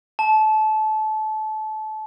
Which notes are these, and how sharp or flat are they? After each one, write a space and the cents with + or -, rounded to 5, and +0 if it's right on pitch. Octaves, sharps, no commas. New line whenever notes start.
A5 -25